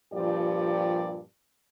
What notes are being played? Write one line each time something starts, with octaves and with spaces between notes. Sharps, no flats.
G2 A#2 F3 G4 D5